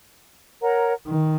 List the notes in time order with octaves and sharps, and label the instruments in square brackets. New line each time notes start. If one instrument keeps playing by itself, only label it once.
[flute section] A#4 C#5 F#5 A#5
[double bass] D#3